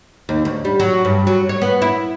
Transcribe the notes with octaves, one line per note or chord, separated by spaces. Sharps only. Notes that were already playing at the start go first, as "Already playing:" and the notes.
D#2
D2
G3
F#3
G2
F#3
C#5
B3
E4